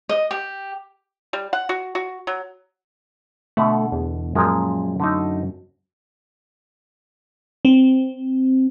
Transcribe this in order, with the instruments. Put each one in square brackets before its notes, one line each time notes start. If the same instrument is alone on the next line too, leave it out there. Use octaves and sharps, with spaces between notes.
[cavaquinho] D#5
G4
[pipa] G3
F#5
F#4
F#4
F#3
[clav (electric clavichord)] B2 D3 F#5 [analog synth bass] A3
[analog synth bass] E2
[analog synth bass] F#2 [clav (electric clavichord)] A#2 F3 G#3
[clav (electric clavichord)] D3 A3 D#4
[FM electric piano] C4